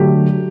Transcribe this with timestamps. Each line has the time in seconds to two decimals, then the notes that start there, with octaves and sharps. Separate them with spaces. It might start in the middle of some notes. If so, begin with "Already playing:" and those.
Already playing: D3 F#3 A3 G4